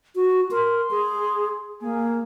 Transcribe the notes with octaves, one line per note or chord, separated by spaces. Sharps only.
F#4
A#4 C6
G#4
A#3 G#4